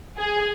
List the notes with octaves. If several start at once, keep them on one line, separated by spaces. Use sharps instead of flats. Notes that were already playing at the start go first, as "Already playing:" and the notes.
G#4